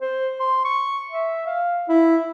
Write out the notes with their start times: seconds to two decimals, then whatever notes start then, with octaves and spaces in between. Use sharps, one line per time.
0.01 C5
0.40 C6
0.65 C#6
1.11 E5
1.46 F5
1.89 E4